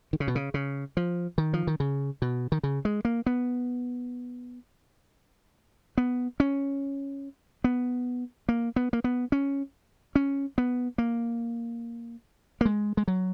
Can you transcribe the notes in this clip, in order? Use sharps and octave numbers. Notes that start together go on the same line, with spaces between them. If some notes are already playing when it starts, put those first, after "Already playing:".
D#3
C#3
B2
C#3
C#3
F3
D#3
F3
D#3
C#3
B2
D#3
C#3
G#3
A#3
B3
B3
C#4
B3
A#3
B3
A#3
B3
C#4
C#4
B3
A#3
A#3
G#3
G#3
F#3